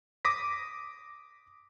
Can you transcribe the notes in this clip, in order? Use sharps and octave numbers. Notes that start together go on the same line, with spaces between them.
D6 D#6 A#6 B6